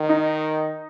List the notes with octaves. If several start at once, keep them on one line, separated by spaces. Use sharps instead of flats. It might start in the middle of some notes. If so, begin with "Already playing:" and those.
Already playing: D#3
D#4